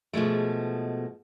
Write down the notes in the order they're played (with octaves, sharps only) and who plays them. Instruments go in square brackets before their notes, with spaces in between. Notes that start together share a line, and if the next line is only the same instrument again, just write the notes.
[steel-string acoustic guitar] B2 F3 G#3 A3